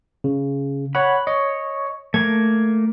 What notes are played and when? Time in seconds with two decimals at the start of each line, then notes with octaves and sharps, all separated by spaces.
0.24 C#3
0.95 C#5 F#5 B5
1.27 C#5 D#5
2.14 A3 A#3 A#4 G#6